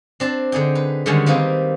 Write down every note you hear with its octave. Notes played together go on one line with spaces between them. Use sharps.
C4 D4 A5
D3 D#4 G#4 G5
B4
D3 D#3 G3 G#3 C#4 A#5
D#3 A#3 C4 D#4 B4